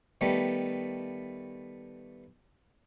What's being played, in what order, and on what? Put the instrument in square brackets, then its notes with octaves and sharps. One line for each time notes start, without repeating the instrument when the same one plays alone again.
[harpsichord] D#3 G3 A3 B3